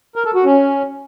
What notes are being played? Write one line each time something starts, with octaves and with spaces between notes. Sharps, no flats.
A#4
A4
F#4
C#4